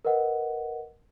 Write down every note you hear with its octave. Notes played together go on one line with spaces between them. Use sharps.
A#4 B4 D#5 F#5